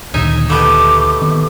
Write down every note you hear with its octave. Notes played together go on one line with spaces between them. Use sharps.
D2 A#2 D#3 D#4 E5 G#5
A3 B3 G4 D6
D#3 B3